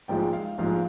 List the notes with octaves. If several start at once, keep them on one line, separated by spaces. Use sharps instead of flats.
A#1 G#2 F3 G#3 G5
F5
A#1 G#2 F3 G#3 F5